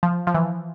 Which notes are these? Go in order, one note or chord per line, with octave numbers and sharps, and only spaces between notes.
F3
F3
E3